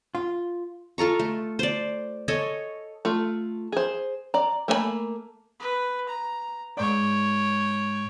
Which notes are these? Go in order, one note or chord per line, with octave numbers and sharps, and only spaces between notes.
F4
F4 A4 A#5 C#6
A3
C5 D5
A4 C#5 D#5 G#5
A3 F4
G#4 C5
D5 A#5
A3 A#3 C5 G#5 B5
B4
A#5
G#2 C#5 D5 G5